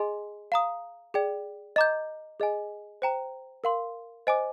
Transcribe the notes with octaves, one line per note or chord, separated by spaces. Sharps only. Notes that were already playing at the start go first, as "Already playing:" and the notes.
Already playing: G#4 D#5 G#5 C6
F5 A#5 D#6
G#4 D5 G5
D#5 A#5 D6 G6
G#4 D#5 G#5
C5 G5 A#5
A#4 F5 C6
C5 D#5 G#5 D6